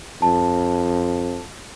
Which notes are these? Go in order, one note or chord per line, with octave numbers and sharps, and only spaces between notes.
F2 A5